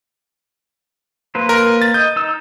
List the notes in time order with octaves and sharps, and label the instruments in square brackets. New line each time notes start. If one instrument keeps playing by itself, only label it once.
[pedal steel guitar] A#3 B4 C5
[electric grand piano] A#4
A6
[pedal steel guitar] D#5 [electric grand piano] G6
[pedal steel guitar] D#4 E6